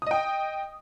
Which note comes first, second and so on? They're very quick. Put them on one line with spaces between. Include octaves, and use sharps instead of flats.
D#6 D#5 G5